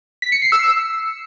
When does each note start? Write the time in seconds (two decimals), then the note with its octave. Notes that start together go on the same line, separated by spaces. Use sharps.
0.22 B6
0.32 C#7
0.42 C7
0.52 E6